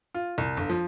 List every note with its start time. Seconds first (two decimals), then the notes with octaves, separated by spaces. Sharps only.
0.15 F4
0.38 C2
0.57 G1
0.70 F3